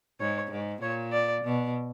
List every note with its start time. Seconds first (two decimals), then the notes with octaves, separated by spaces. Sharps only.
0.20 G#2 C#5
0.51 G#2
0.82 A#2 C#5
1.12 D5
1.44 B2